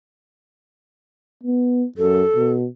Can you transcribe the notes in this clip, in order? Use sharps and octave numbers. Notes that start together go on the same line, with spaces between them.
B3
F#2 A4
B2